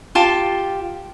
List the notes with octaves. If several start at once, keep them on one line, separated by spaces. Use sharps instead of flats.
F4 G4 A5